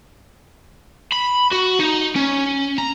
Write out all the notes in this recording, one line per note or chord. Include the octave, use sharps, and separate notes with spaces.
B5
F#4
D#4
C#4
A#5